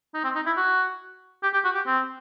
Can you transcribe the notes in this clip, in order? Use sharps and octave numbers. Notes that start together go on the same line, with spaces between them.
D#4
C4
D#4
E4
F#4
G4
G4
F#4
G4
C4